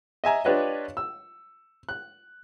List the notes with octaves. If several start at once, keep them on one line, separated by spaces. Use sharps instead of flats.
D#5 E5 G#5 A#5
D4 F4 G4 B4 C#5 D#5
E6
F#6